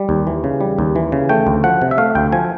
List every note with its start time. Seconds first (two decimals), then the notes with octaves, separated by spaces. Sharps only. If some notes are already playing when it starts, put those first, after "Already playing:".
Already playing: G3
0.09 D#2
0.27 E3
0.44 C#3
0.61 G3
0.79 D#2
0.96 E3
1.12 C#3
1.29 A3 G5
1.47 D2
1.64 F3 F#5
1.82 C3
1.91 E5
1.98 A3 F5
2.15 D2 G5
2.32 F3 G#5